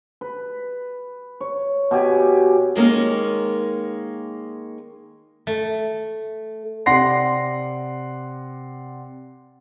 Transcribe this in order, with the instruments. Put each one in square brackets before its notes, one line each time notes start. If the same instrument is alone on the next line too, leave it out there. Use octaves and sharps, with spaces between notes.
[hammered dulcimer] B4
C#5
B2 G4 G#5
[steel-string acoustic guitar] D#3 G#3 A#3 C#4
[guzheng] A3
[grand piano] C3 D5 F#5 C6 A#6 C7